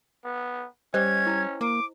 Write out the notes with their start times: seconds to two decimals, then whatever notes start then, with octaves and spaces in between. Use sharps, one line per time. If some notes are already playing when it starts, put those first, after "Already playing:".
0.24 B3
0.94 G3 C#4 C5 D#5 G#6
1.27 E4
1.61 A#3 D6